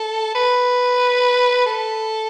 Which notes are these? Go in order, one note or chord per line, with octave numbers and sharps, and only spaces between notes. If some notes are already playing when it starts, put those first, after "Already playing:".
Already playing: A4
B4
A4